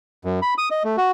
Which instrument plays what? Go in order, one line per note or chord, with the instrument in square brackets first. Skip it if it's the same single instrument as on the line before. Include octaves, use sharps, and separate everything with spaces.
[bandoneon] F#2
B5
D#6
D#5
A3
F#4